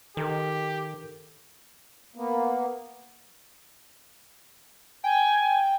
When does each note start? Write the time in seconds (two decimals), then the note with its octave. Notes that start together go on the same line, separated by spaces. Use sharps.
0.17 D#3 G4 A4 A#4
2.16 A#3 B3
5.04 G5 G#5